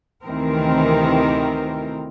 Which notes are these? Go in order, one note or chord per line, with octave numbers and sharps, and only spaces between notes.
D2 C3 D#3 E3 C4 A#4